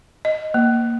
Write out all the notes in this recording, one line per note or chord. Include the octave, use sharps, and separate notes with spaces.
D#5
A#3